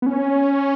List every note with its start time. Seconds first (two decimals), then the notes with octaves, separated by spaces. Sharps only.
0.02 B3
0.06 C#4